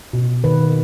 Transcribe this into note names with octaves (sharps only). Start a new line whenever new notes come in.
B2
D#3 B4